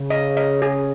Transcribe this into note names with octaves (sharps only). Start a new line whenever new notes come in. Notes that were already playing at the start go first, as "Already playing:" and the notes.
Already playing: C#3
D#5
D#5
G#4